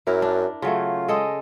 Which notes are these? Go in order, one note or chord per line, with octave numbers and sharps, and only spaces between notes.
F#2 E4 A#4
D4
C#3 F#3 A3 F4
G#3 A4 D#5